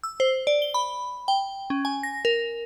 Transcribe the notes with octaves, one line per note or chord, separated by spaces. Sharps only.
E6
C5
D5
G7
B5
G5
C#4
G#5
A#6
A#4